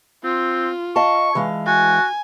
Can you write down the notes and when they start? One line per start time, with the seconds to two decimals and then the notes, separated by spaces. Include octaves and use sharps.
0.24 C4 F4
0.96 D#5 F5 A5 C#6
1.35 E3 G#3 F5
1.67 F#4 G#5